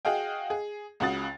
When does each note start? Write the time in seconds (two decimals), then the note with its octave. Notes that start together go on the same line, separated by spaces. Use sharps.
0.05 F#4 G#4 D#5 F5 G5
0.50 G#4
1.00 C#2 C#3 F#4 D#6 A6